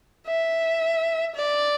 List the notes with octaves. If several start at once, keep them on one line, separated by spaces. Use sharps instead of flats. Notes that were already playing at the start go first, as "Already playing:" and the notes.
E5
D5